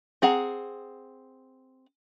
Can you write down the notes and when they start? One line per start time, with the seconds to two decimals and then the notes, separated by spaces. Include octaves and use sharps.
0.22 C4 G#4 F#5 A#5